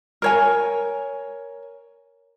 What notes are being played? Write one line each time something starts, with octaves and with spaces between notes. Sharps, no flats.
A#4 C#5 G#5